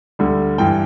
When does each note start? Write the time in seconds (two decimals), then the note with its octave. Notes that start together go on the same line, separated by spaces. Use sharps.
0.19 D2 D3 G3
0.58 G2 E3 G3 G5